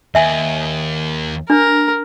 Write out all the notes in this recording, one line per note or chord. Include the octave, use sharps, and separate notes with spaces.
D#2 E5 G#5
D4 A#4